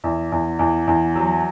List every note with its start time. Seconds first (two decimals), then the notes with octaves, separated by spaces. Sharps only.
0.04 E2
0.32 E2
0.59 E2
0.88 E2
1.16 F#3